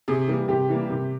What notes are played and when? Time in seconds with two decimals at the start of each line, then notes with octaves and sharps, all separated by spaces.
0.08 C3 G#4
0.28 E3 G3 A#3
0.48 C3 G4
0.69 E3 G3 A#3
0.90 C3